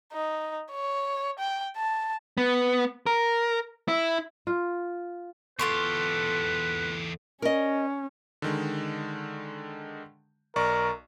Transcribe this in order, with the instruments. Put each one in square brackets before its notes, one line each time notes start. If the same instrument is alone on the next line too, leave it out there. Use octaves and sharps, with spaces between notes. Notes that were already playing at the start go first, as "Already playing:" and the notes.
[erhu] D#4
C#5
G5
A5
[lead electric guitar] B3
A#4
E4
[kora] F4
[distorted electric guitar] E2 G4 [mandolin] F4 C6 C#6 [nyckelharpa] A4 [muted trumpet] B4
[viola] C#4 [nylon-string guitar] A#4 D#5
[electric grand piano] D3 D#3 G#3
[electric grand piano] B1 D5 C#6 [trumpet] A#4